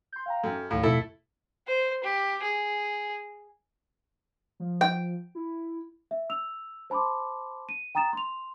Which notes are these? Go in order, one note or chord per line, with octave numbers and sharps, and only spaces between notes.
C6 G6
F5 G5 A#5
F#2 A4 G5
D#2 A2 F5
F2 B2 A3 E4 A4
C5
G4
G#4
F3
G5
E4
E5
E6 F7
C5 A5 B5 C6 D6
D#7
G5 A#5 D#6 A6 E7
C6 F7